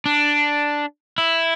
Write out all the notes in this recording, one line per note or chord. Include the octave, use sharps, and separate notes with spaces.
D4
E4